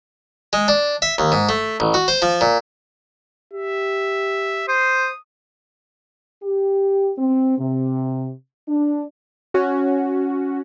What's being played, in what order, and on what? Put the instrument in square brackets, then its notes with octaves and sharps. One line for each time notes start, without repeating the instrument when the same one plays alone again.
[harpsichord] G#3
D4
E5
D#2
G#2
A3
A1
F#4
C5
F3
A#2
[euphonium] G4 [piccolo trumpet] E5
[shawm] C5 [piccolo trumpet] D#6
[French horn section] G4
C4
C3
D4
[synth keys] C#4 F#4